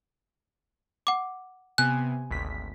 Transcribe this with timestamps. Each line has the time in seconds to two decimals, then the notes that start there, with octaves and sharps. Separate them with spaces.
1.07 F#5 D6
1.78 C3 B3 G#5 F#6
2.31 G#1 D2 B6